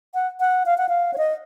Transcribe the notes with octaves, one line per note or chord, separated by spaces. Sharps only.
F#5
F#5
F5
F#5
F5
C#5
D#5